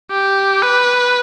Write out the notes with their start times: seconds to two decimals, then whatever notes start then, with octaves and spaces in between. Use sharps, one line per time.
0.11 G4
0.62 B4